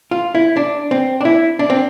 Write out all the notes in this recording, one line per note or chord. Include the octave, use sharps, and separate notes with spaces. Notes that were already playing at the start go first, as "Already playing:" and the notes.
F4
E4
D4
C4
D4
E4
D4
C4